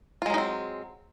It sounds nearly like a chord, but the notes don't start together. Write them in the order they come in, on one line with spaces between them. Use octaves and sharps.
F4 G#3 F#3 D#4 C4